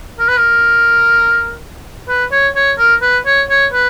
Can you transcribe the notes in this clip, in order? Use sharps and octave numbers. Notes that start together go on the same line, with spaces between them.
A#4
B4
A#4
B4
C#5
C#5
A#4
B4
C#5
C#5
B4